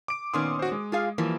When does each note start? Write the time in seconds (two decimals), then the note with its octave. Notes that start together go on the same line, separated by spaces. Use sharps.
0.08 D6 D7
0.33 A#2 D#3 B3 C#4 C6 D#6
0.59 F#4 C5
0.72 G#3
0.92 F4 G#4 F5
1.18 E3 F3 G3 A#3